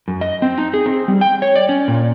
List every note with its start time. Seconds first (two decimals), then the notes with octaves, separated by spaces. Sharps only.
0.08 F#2
0.21 D#5
0.42 C4
0.58 D#4
0.74 G#4
0.86 C4
1.08 G3
1.21 G5
1.42 C#5
1.56 D5
1.69 C#4
1.88 A#2